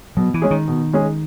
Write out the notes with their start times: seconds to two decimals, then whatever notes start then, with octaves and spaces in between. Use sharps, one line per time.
0.17 B2 F#3
0.34 E3
0.42 G#3 C#4 G#4
0.51 D#3
0.68 B2
0.93 G#3 C#4 G#4